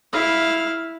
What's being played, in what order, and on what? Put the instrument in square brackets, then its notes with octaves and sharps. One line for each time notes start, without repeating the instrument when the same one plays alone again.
[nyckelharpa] E4 F5